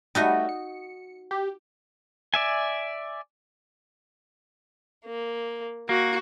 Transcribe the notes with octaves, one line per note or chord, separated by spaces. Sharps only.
G3 A3 D#4 F#4 D#5
C#7
G4
D5 E5 G#5
A#3
A#3 F#4